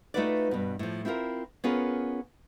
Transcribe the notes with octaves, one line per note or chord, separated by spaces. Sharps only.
A3 D#4 F4 F#4 B4 D5
G2 B2
A2 F3
C4 E4 F4 G#4 A#4
B3 C#4 F4 G#4 A#4 C#5